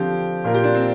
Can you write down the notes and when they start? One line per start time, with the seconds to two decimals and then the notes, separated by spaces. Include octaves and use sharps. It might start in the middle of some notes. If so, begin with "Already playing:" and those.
Already playing: D3 F3 C4 G4
0.44 A#2 A#3 F4 A#4
0.54 G4
0.64 D4
0.74 C4